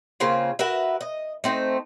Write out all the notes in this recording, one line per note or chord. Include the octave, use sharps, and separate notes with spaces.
C#3 A#3 C4 F4
F#4 A#4 B4 E5
D#5
A3 C4 D#4